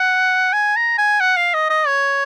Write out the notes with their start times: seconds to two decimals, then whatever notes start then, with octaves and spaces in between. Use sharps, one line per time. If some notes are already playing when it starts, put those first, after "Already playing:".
Already playing: F#5
0.53 G#5
0.76 A#5
0.98 G#5
1.21 F#5
1.37 F5
1.54 D#5
1.70 D#5
1.87 C#5